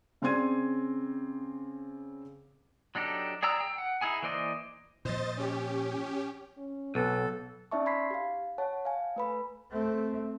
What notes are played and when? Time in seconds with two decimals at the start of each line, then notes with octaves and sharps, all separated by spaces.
0.22 C#3 C4 D5 C6 G#6 D#7
2.95 F#3 D4 D#4 G4 A4
3.43 G#4 D5 G5 A#5 E6
3.60 G5
3.78 F#5
4.01 D#4 E4 G#4 G#5
4.23 E3 A#3 C5 D5 D#5
5.05 A#2 F3 C5 D#5 A6
5.37 C#4 G4
6.57 C#4
6.95 B1 B3 A4
7.71 C#4 D#4 D5 E5 A5 C#6
7.86 B5 C6 G#6 B6 C7
8.11 G4 F5
8.58 C#5 F#5 A5
8.85 F5 G#5
9.16 A3 B4 B5
9.71 A3 C4